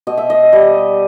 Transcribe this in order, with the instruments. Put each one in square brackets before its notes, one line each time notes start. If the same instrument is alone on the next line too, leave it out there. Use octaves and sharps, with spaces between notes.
[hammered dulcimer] B2 D#5
E5
D#5
G3 D#5